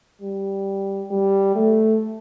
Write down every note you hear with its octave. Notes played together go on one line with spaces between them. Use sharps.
G3
G3
A3